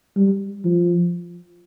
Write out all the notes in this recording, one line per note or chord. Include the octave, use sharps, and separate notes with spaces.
G3
F3